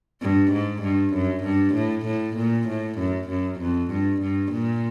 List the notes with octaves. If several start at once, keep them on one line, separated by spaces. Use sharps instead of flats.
G2
G#2
G2
F#2
G2
A2
A2
A#2
A2
F#2
F#2
F2
G2
G2
A#2